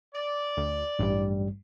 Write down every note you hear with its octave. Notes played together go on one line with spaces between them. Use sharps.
D5
D2
A1 G2 G3